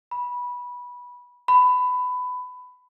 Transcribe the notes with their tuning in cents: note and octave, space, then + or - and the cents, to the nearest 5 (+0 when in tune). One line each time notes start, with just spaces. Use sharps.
B5 -15
B5 +20